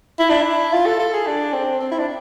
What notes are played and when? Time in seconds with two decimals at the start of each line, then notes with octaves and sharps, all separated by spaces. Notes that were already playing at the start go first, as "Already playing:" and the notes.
0.19 E4
0.30 D4
0.42 E4
0.73 F4
0.86 A4
0.99 A4
1.13 G#4
1.27 D4
1.53 C4
1.80 C4
1.92 E4
1.99 D4